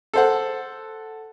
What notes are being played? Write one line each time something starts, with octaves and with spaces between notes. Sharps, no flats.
A4 C5 F#5